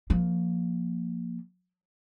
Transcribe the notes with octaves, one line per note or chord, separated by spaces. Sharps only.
F3 A#3